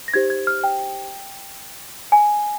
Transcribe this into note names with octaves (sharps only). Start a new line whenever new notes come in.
A#6
D#4 G4 C5 G#6
G#6
F6
G5
G#5